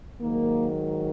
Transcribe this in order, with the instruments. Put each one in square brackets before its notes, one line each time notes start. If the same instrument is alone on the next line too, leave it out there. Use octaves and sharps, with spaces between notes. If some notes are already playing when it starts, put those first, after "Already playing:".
[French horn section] G#2 D#3 F#3 A#3